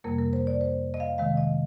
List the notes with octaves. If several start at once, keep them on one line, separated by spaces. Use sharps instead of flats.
F2 C3 G3 A#3 A#4
A#4
C5
D5
C5
D#5
F5
C3 D#3 G#3 F5
D#5